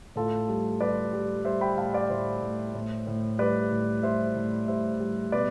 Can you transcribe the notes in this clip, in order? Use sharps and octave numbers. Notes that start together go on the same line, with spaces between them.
A2 F4 A4
G3
G3 B4 D5
G3
G3 C5 E5
G5 B5
A2 F5 A5
D5 F5
A2 C5 E5
A2
A2
A2
G3 B4 D5
A2
G3 C5 E5
A2
G3 C5 E5
G3
B2 B4 D5